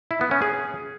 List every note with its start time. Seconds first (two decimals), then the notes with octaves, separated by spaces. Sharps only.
0.11 E4
0.21 B3
0.31 C#4
0.42 G#4